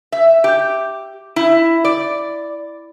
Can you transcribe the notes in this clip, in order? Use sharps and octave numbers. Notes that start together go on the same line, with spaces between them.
E5
G4
E4
D5